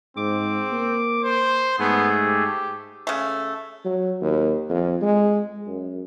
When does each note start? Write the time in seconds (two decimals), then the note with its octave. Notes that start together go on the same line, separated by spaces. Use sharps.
0.17 G#2 C4 D6
0.73 A#3
1.23 C5
1.79 G#2 A3 B3 G#4
2.25 G4
3.07 C#3 A3
3.85 F#3
4.21 D#2
4.69 F2
5.02 G#3
5.67 F#2